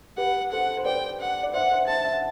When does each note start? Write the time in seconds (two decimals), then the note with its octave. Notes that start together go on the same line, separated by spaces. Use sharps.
0.17 G4 B4 F#5
0.51 A4 C5 F#5
0.77 C5
0.85 B4 D5 G5
1.20 F#5
1.43 D5
1.54 C5 E5 F#5
1.71 C5 E5
1.87 C5 E5 A5
2.05 E5
2.13 F#5